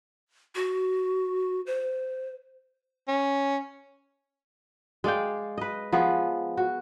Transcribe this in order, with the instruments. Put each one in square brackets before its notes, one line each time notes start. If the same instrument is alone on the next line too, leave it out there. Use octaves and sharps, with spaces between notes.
[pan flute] F#4
C5
[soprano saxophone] C#4
[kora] G#3 D5 F5 G5
B4 D#5
F3 B3 G#4
F#4